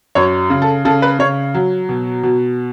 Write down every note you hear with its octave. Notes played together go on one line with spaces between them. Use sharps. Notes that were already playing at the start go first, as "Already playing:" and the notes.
F#2 C#5
C#3
A4
C#3 A4
B4
C#3 C#5
F#3
B2
B2